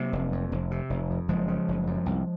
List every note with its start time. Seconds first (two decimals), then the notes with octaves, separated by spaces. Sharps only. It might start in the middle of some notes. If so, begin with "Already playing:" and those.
Already playing: C3 F#3 A#3
0.13 F1
0.32 F2
0.52 F1
0.71 C3
0.90 F1
1.10 F2
1.28 F#1 F3 G#3
1.48 C#3
1.68 F#1
1.87 F#2
2.06 C2